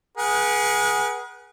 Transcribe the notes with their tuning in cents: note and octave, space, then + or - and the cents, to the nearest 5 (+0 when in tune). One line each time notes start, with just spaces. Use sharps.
G#4 +0 B4 -40 F#5 +20